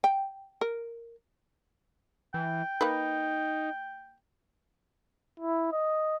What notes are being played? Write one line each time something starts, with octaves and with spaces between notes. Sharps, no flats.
G5
A#4
E3 G5
A#3 D#4 B4
E4
D#5